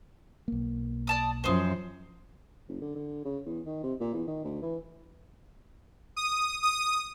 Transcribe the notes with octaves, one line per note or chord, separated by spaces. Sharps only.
B1 A#3
D5 A5 D#6
F#2 F3 G#4 C5
F#1
D3
D3
C#3
E2
D#3
C3
A#2
E2
D#3
D2
E3
D#6
D#6